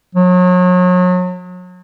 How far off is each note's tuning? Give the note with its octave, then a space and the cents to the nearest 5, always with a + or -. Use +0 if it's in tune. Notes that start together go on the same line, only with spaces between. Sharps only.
F#3 -35